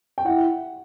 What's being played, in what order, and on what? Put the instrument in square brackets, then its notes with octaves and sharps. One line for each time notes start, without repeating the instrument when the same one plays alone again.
[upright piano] G5
[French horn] E4 [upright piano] F#5